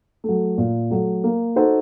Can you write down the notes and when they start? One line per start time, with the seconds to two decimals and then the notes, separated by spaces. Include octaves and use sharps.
0.24 F#3 A3
0.58 A#2
0.90 F#3 A3
1.24 A#3
1.56 D#4 F#4 A4 C5